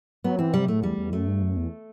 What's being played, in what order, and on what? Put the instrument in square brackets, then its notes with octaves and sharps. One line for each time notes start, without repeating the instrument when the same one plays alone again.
[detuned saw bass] F#3 [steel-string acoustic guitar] B3
[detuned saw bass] E3 [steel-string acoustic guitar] C4
[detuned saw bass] C3 [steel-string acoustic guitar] G3
[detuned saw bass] A2 [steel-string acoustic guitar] A3
[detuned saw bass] E2 [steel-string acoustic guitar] G3
[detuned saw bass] E2
[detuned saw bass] F#2 [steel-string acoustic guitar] A3
[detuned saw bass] G2
F#2
E2